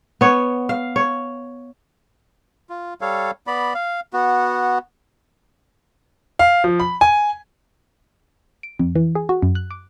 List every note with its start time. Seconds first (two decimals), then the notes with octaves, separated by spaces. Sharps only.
0.21 B3 C#5
0.69 F5
0.96 C#5
2.70 F4
3.01 G3 A4 C#5 F5
3.47 B3 D5 B5
3.74 F5
4.13 B3 F#4
6.39 F5
6.64 F3
6.80 B5
7.01 G#5
8.63 D7
8.79 F2
8.95 E3
9.15 G#4
9.29 F#4
9.42 F#2
9.55 F#6
9.71 D6